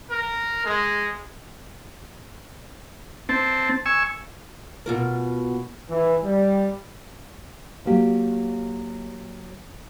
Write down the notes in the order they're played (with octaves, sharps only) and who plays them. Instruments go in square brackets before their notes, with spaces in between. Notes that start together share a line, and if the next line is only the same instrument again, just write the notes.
[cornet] A#4
G#3
[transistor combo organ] C4 A5
G#5 C#6 E6
[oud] B2 F4 A#4
[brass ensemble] E3
G3
[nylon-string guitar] F#3 A#3 G4